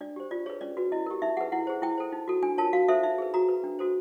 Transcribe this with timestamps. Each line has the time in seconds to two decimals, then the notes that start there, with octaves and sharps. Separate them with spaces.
0.01 D4 D5
0.16 G4 C5
0.31 F4 D5
0.46 G#4 B4 C#5
0.61 C#4 D5
0.77 F#4 B4
0.92 E4 D#5
1.06 G4 A#4
1.22 D#4 E5
1.37 G#4 B4 F#5
1.52 E4 F#5
1.67 G#4 C5
1.82 E4 G5
1.97 A4 C5
2.12 D#4
2.28 F#4 A4
2.43 D4 G#5
2.58 F4 A#4 C#5 A5
2.73 F#4 F5
2.89 A4 C5 E5
3.03 D#4 E5
3.18 G#4 B4
3.34 F#4 A#5
3.49 B4
3.64 D4
3.79 F#4 A4 C5